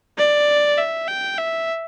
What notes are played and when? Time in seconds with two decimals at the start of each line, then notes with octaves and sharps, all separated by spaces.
0.18 D5
0.78 E5
1.08 G5
1.38 E5